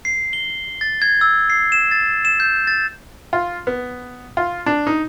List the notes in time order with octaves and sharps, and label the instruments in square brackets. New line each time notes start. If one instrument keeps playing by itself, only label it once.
[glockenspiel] C7
G7
A6
G#6
E6
C7
E7
A6
E7
G6
A6
[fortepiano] F4
B3
F4
D4
D#4